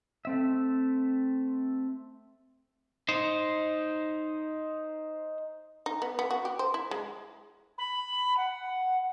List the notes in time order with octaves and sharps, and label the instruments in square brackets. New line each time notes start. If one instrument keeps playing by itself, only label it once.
[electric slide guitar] A3 C4 E5
[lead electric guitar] D#4 C5
[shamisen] D#4
B3
B3
F#4
G4
C5
E4
G#3
[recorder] B5
F#5